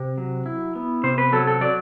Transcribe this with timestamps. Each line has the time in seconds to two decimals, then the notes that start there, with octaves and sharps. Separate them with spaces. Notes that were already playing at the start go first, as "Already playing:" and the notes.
Already playing: C3
0.18 F#3
0.46 E4
0.76 B3
1.03 C3 C5
1.18 B4
1.32 F#3 A4
1.47 A4
1.61 F#3 D5